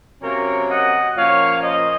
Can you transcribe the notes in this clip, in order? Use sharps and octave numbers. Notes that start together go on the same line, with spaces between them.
C3 F#3 A#3 C#4 A#4 C#5
D#5 F#5
A#2 F3 A#3 C#4 C#5 F5
C5 D#5